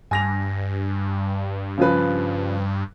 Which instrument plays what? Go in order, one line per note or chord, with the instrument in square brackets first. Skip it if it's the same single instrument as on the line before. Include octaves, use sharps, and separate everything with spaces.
[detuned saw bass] G2 [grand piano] G#5 A#6 F7
[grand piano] C#3 F3 B4